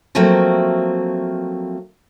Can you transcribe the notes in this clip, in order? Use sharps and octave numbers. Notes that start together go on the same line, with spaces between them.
F3 F#3 A3 A#3 C4